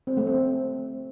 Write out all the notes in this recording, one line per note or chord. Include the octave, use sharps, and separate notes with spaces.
C4
A3
C4